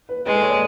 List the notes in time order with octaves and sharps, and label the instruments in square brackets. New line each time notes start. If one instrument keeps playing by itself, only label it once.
[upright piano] B4
[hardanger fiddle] G#3 [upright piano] B4
[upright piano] A4
C#5
D5